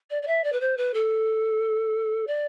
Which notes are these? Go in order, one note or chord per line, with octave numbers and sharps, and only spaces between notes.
D5
D5
E5
D5
B4
C5
B4
A4
D5